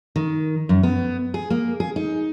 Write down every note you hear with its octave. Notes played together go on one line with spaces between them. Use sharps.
D#3
F#2
B3
G#4
A#3
G#4
D#4